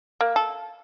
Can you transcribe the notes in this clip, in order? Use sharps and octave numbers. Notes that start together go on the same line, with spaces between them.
A#3
A4